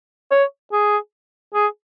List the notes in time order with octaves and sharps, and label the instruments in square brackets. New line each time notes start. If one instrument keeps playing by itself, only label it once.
[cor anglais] C#5
G#4
G#4